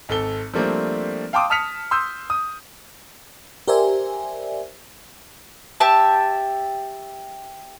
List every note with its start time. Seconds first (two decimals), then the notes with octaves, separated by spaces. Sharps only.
0.09 G#1 A4 G7
0.54 F3 G3 A3 A#3 C4 D4
1.33 F5 G5 A5 C6 D6 D#6
1.50 A5 D#6 F6 B6 C#7 F7
1.91 C6 D#6 E6 G6
2.30 D#6
3.68 G4 A#4 C5 D5 E5 G#5
5.80 G4 E5 A5